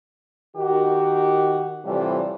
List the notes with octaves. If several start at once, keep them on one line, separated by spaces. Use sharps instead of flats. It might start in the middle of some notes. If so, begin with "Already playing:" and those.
D#3 F#4 G4
A2 C3 E3 F3 G3